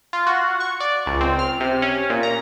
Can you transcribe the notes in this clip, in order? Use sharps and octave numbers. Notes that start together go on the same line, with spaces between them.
F4
F#4
C#6
D5
C#2
C4
F6
C3
C#4
A#2
A#5